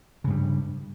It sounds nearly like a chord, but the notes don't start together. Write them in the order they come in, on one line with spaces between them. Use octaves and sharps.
C#3 G2 G3